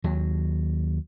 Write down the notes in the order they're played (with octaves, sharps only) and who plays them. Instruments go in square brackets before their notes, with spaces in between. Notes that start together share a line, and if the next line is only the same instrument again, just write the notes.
[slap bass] D#2 F#3